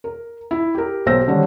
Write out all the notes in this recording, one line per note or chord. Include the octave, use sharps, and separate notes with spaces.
A#4
E4
G4 A#4
B1 G4 C5 E6 A#6
D3 D#3 G3 C#4